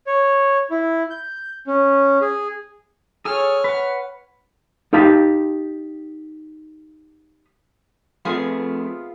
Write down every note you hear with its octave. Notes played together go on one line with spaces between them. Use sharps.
C#5
E4
G6
C#4
G#4
G#4 A4 C#5 G#5 F6
B4 F#5
D#4 G4 F5 A5
F3 A3 B3 C4 F4 G#4 E5 G#5